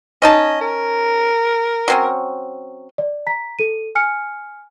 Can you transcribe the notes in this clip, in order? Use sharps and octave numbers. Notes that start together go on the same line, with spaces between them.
C#4 D#4 D#5 A5
A#4
F#3 C4 C#4
D5
A#5 B6
A4 D#7
G#5 F6 C#7